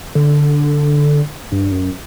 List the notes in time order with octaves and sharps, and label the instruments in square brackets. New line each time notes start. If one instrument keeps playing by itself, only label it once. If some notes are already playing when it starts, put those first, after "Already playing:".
[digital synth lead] D3
G2
F#2